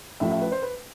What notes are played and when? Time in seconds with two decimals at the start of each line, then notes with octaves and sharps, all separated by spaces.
0.20 A1 A2 F3 E5
0.31 E5
0.41 B4
0.52 C5
0.62 B4